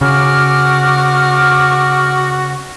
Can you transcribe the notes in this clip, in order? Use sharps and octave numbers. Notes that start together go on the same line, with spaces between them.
C#3 F#4 D6 F6